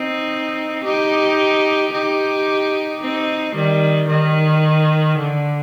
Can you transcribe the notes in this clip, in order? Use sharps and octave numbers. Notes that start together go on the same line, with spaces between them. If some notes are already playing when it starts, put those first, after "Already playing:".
Already playing: C4 D#4
D#4 G4
D#4 G4
C4 D#4
D#3 G3
D#3
D3